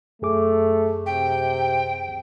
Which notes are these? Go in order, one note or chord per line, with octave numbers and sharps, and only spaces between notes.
F#2 A3 G#4 D6
C3 G5